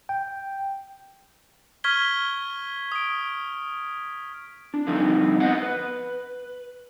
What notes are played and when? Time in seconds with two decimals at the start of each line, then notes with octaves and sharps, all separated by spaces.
0.09 G5
1.84 C#6 F6 G#6 B6 G7
2.92 D#6 D7
4.74 D4
4.87 D3 F3 G3 A3 C4 D#4
5.40 B3 C5 D#5 F#5
5.62 B4